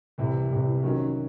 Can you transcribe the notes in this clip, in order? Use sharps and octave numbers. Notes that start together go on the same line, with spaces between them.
C2 C3 E3
C2 C3 E3
D#3 F#3 C#4